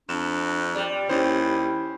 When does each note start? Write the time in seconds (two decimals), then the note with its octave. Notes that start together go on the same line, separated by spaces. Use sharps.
0.09 F2 D4 E7
0.75 G3 D5
1.09 D#2 C#4 E4 C5